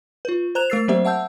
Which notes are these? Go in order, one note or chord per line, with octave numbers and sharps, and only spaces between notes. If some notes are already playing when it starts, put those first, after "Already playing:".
F4 B4
C5 A#5 F#6 E7 F7
A3 A#4 E6 A6 C7
F#3 A#3 C4 G4 C5 E5
E5 F#5 A5 E6 G6